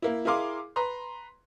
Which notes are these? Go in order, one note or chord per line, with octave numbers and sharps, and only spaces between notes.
A#3 E4
E4 G#4 A#4 F5 C6 D6
B4 A#5 C6